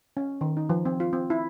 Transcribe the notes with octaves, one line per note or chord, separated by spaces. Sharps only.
C#4
D#3
D#4
F3
C4
F4
C4
E4